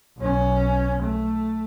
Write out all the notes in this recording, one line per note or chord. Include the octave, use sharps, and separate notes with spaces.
B1 C#4
A3